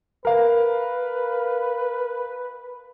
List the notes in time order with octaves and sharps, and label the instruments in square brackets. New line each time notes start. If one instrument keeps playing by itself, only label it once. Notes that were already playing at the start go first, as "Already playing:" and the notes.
[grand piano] A#4 F5 [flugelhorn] B4